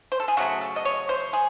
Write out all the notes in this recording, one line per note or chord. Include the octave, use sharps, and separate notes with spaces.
C5
A4
G#4
C#3 F#3 A3 F#4
A4
D#5
C#5
C5
G#4